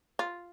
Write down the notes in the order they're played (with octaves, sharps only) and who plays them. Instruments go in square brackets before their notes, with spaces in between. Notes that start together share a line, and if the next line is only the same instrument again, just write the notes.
[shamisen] F4